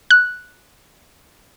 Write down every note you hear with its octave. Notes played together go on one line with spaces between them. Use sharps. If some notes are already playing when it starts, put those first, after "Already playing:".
F#6